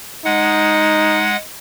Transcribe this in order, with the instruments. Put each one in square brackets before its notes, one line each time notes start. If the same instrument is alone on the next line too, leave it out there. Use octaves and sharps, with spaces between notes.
[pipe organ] G#3 F#5 [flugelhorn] D#4